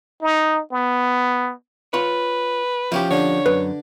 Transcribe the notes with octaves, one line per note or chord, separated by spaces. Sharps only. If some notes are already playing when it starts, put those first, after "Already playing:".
D#4
B3
F4 B4 C#5
F3 C#4 E4 G4 C#5 G5
D3 D4 C#5
F#2 B4